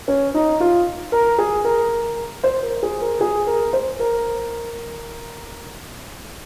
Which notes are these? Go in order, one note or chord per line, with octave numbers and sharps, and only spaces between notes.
C#4
D#4
F4
A#4
G#4
A#4
C5
A#4
G#4
A#4
G#4
A#4
C5
A#4